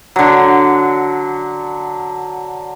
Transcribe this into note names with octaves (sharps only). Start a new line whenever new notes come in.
D3 F#3